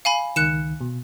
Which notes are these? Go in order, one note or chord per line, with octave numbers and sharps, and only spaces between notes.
F5 G#5 B5
C#2 D#3 F#6 C#7 E7
B2